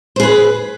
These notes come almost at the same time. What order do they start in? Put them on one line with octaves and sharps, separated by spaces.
C5 G#4 B4